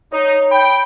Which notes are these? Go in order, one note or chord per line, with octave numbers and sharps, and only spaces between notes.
D#4 C#5
G5 B5